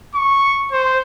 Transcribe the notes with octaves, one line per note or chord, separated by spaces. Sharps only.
C#6
C5